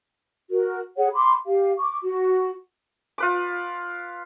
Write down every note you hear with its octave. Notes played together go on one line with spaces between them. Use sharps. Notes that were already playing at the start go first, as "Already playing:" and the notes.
F#4 A#4
G#4 C#5 F#5
B5 C6 D6
G4 F5
C#6 D6
F#4
F4 B4 D6